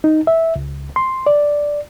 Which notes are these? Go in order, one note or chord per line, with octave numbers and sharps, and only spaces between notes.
D#4
E5
C#2
C6
D5